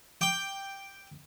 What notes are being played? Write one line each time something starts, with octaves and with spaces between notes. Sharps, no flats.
G5 D6